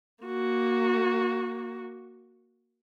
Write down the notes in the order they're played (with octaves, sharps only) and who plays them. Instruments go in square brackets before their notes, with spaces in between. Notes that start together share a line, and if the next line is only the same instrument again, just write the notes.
[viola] A#3 F#4